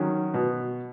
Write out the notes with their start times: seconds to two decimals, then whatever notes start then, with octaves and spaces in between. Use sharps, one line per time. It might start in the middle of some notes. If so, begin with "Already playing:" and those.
Already playing: D#3 F#3 C#4
0.34 B2 B3